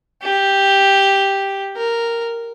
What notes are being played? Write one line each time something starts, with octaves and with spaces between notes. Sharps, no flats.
G4
A#4